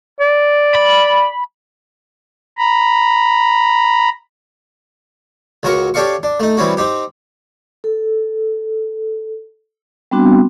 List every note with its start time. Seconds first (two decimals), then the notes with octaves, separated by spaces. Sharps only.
0.20 D5
0.75 B5
2.58 A#5 B5
5.63 C#2 F#3 F#4 A#4 C#6
5.94 C#4 G4 A4 D5 F5 C#6
6.23 D4
6.40 A3 D#4
6.57 E3 G3 C4 C#4 F#4
6.77 C4 D#4 G4
7.84 A4
10.11 G3 B3 C4 D4 F#4